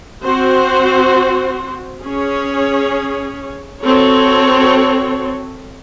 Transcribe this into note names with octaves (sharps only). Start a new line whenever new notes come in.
C4 F#4 C5
C#4 G#4 C#5
C4 F#4 A4 C#5